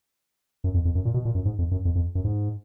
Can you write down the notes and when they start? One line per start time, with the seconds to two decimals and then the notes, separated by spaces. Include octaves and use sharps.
0.64 F#2
0.74 F2
0.85 F2
0.95 F#2
1.05 A#2
1.14 B2
1.25 A#2
1.35 F#2
1.45 G#2
1.59 F2
1.71 F#2
1.85 F2
1.95 F2
2.15 F#2
2.24 G#2